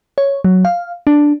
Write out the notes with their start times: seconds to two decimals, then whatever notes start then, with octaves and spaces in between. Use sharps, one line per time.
0.18 C#5
0.44 F#3
0.65 F5
1.07 D4